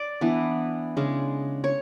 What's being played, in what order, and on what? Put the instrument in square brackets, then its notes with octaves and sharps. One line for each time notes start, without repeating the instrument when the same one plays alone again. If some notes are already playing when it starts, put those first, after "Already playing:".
Already playing: [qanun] D5
E3 B3 D4
C#3 G#3 D4
C#5